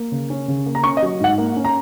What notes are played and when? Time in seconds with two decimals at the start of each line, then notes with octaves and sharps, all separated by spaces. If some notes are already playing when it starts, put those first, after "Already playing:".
Already playing: A#3
0.12 C#3
0.30 C#4
0.48 C#3
0.66 A#3
0.75 A#5
0.84 C#4 C#6
0.97 D#5
1.02 F#3
1.20 G#2 F#5
1.38 A#3
1.56 C#4
1.65 A#5